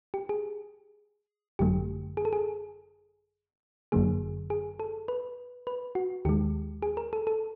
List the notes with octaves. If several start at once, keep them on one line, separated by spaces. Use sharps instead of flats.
G4
G#4
G#1 F#2 D3 F#3 A3 G4
G#4
A4
G#4
G1 F#2 D3 F#3 A#3 G#4
G#4
A4
B4
B4
F#4
D#2 D#3 G#3 G4
G#4
A#4
A4
A4